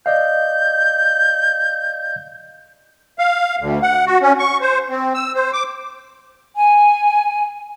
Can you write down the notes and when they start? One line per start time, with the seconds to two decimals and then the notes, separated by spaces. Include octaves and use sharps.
0.06 D5 D#5 F5 G6
3.19 F5
3.59 D2
3.83 F#5
4.07 F#4
4.22 C#4
4.39 C#6
4.61 C5
4.89 C4
5.14 E6
5.35 C5
5.53 D6
6.56 G#5